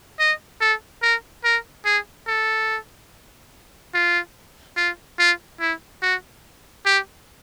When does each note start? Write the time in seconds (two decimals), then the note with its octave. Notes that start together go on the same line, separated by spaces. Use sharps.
0.20 D#5
0.61 A4
1.03 A#4
1.44 A#4
1.85 G#4
2.28 A4
3.94 F4
4.77 F4
5.19 F4
5.60 E4
6.02 F#4
6.86 G4